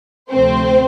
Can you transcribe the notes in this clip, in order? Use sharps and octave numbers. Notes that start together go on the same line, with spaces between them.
D2 C3 F3 A3 C4 C5